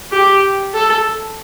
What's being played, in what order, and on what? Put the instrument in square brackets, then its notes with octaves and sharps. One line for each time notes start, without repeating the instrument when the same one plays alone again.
[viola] G4
A4